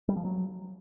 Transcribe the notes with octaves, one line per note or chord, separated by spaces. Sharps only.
G3
F3
F#3